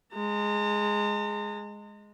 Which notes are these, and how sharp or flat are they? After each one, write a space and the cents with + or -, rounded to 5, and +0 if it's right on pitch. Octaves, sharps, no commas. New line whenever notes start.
G#3 +0 A#5 -45